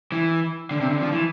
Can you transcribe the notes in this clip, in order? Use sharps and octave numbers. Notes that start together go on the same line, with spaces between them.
E3
D3
C3
D3
F3
E3